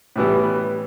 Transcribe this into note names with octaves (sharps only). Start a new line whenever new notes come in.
A2 E3 G3 B3